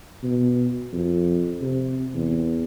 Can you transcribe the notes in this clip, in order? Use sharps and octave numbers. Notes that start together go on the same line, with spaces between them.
B2
F2
C3
E2